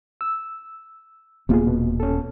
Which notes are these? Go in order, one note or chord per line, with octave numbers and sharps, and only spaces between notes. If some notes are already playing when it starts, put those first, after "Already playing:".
E6
D#1 C3 A#3 B3 F4 G#4
B2
C#4 A4